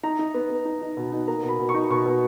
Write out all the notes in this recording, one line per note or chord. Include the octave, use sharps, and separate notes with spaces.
D#4 A#5
D#4
B3
B3
D#4
D#4
B2
D#4
A#3 A#5
B2
B5
B2
C#6
D#4
B2 C#6
B2